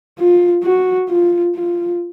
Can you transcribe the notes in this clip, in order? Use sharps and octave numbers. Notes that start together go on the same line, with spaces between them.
F4
F#4
F4
F4